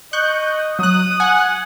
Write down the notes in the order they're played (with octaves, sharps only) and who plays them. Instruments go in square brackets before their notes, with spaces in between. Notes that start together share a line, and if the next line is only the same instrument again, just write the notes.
[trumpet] D#5 [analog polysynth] C#6 F#6 G6
[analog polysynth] F#3 F#6 [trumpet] D#6
[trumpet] F#5 [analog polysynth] G#5 F#6